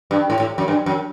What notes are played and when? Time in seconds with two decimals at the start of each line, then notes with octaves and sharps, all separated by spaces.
0.11 G2
0.30 A2
0.40 A2
0.58 F#2
0.68 G2
0.86 F#2